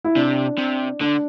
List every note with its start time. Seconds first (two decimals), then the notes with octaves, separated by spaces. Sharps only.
0.04 E4
0.16 C3 D4
0.58 C3
1.01 D3 D4